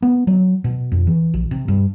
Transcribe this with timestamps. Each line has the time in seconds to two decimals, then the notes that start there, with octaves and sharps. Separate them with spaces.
0.02 B3
0.27 F#3
0.64 B2
0.92 F2
1.07 E3
1.34 A#1
1.51 C3
1.68 G2